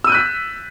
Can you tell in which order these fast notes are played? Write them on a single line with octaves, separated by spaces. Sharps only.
E6 D#7 G6 F#6 B6